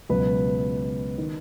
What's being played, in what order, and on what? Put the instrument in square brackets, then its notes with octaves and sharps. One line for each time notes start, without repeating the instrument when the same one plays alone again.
[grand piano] C#2 B2 F#3 B4
D#3